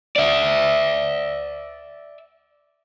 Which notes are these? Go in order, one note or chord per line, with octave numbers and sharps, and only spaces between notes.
D5 E5